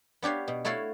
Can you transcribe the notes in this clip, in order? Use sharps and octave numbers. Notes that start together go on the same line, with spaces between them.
B3 D4 G4 C#5 F5
B2
A3 E4 F#4 A4 C#5 F5